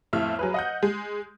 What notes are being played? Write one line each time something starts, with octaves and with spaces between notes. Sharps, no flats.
B1 F2 A2 E5 F6
F#3 G#4 B4
D#5 F#5 G6
G#3